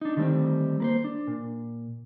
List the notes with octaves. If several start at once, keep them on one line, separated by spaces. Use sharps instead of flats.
D4 D#4
D3 D#3 G3 A3 C4
A#3 B4 C5
D4
A#2